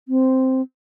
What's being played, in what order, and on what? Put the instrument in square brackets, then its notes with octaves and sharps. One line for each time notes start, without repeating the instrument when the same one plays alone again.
[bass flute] C4